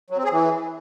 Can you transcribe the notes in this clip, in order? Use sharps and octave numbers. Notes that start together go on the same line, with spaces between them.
F#3
C4
G#4
E3